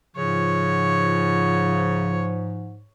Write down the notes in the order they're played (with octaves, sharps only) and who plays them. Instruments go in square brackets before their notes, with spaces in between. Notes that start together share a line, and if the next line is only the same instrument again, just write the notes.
[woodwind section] G#2 [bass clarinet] C#3 [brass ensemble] F3 [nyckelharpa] C#5